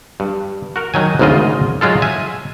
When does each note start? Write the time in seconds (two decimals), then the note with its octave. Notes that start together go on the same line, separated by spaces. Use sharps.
0.20 G2
0.76 F#4 A#4
0.94 D#3 F#3 G#5
1.19 G#1 D2 G#2 C#3 F4 D#5
1.81 F#3 G#3 F4 A4
2.02 E5 G#5